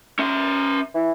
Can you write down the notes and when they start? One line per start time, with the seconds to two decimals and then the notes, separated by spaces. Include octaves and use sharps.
0.19 C#4 E5
0.95 E3